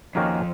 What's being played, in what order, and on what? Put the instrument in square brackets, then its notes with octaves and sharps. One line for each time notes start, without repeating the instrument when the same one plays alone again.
[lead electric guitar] F2 [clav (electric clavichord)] D#3 A#3 C#4 F#4 A#4